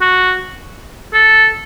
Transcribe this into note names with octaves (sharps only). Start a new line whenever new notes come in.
F#4
A4